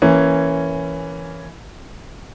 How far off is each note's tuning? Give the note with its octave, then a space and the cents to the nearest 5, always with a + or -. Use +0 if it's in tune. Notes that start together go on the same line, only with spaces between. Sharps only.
E3 +5 A#3 -10 C#4 +0